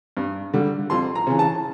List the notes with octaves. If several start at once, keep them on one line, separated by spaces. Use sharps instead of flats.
G2
D3 G3
F2 C6
A#5
C#3 E3
A5